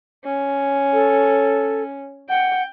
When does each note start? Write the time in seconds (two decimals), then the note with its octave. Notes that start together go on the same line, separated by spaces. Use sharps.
0.25 C#4
0.93 A4
2.29 F#5 G5